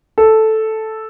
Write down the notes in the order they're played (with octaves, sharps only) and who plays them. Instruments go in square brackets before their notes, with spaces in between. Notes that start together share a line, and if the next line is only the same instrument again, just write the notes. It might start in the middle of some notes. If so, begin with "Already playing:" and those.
[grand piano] A4